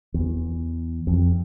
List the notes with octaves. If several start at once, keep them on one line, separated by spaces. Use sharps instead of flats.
E2
F2